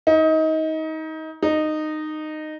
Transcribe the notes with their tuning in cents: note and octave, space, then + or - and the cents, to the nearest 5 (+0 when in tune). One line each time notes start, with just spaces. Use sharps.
D#4 +25
D#4 -15